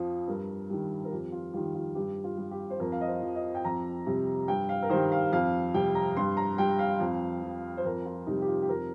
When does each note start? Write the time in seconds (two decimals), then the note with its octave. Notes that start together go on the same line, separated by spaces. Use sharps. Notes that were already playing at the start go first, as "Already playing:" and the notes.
Already playing: F2 F3
0.28 G2 A#4
0.70 D#3 G3
1.05 A#4
1.11 F2 G4
1.32 F4
1.53 D#3 G3 F4
1.75 F4
1.95 G2 G4
2.24 F4
2.37 G3
2.51 G4
2.70 C5
2.80 F2 A#4
2.92 F5
3.01 D#5
3.07 C5
3.22 F3
3.35 D#5
3.55 G5
3.64 F2 A#5
4.06 C3 G3
4.48 G2 G5
4.69 F5
4.82 A#4
4.90 D#3 G3 C5
5.12 F5
5.32 F2 F5
5.74 C3 G3 G5
5.95 A#5
6.16 G2 C6
6.37 A#5
6.58 G3 G5
6.79 F5
7.00 F2
7.42 F3
7.77 C5
7.84 F2 A#4
8.06 F4
8.27 C3 G3 D#4
8.42 G4
8.48 F4
8.62 G4
8.69 F2 A#4